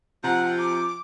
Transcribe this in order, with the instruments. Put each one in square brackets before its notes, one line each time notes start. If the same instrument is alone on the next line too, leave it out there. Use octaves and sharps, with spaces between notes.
[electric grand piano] C3 A#5 [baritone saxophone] F3 [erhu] F#5
[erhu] D6